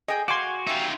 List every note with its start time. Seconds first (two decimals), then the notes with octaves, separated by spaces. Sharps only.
0.08 G#4 D#5 G5
0.28 F#4 F5 G#5 C6 D6
0.67 D#4 F4 G4 E5